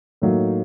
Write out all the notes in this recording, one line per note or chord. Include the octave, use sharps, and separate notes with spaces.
A2 F#3 A#3 D#4